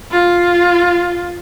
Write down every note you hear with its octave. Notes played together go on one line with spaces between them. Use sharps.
F4